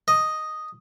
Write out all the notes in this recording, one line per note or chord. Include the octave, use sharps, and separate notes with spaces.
D#5